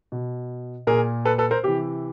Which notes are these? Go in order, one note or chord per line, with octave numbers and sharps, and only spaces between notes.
B2
A#2 G#4 A#4
A4 B4
A4 B4
A#4 C5
C3 E3 G4